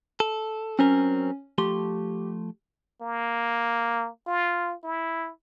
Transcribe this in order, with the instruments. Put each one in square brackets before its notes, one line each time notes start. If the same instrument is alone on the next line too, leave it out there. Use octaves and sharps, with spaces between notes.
[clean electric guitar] A4
[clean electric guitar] F#3 C4 A#4 [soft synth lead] C#4
[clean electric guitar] F3 A3 C6 [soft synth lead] G4
[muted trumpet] A#3
F4
E4